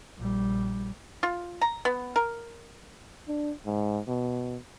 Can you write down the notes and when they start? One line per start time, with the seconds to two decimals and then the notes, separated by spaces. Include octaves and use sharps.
0.18 A#1 G3
1.23 F4
1.61 A#5
1.85 B3
2.16 A#4
3.28 D4
3.66 G#2
4.08 B2